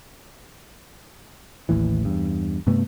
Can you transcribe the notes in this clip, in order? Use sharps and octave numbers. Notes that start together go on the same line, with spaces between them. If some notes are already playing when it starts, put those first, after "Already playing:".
A1 D#2 A2 E3
E2 G2
G2 C3 A3 B3